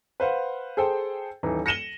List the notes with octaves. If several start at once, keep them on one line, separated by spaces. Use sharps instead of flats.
B4 C5 F5 F#5
G#4 A4 C5 G5
D#1 E3 D#4
A#6 C#7 D#7 E7 F#7 G7